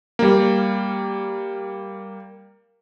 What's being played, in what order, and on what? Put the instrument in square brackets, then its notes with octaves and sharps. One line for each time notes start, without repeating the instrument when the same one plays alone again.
[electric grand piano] G3 A#3